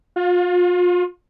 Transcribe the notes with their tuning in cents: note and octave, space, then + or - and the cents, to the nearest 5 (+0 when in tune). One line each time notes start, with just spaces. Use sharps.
F4 +35